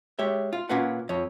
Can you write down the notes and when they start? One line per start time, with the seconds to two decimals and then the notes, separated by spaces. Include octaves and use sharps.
0.19 G#3 G4 C#5 E5
0.53 F4
0.69 A#2 C#4 F4 A#4 B4 F#5
1.09 F2 C#5